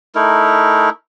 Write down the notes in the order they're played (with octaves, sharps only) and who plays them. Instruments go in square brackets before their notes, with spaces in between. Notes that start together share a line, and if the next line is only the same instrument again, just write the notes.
[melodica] A3 D#4 E4 A#4